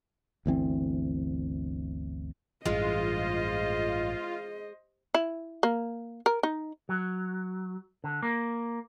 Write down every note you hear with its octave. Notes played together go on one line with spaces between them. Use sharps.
G1 D2 E3 C4
A1 G2 E3 G#3 F4 C5 D#5
E4
A#3
A#4
D#4
F#3
D3
A#3